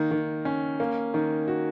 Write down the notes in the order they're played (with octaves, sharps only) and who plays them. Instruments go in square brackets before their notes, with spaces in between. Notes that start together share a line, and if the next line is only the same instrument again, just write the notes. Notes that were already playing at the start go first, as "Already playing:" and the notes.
Already playing: [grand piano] D#3 A#3
D#3
C#4
A#3
D#3
F#4